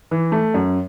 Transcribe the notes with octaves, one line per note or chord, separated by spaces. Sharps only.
E3
A3
F#2